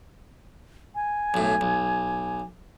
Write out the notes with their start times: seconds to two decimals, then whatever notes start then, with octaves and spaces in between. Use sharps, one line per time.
0.95 G#5
1.34 B1 A2
1.61 B1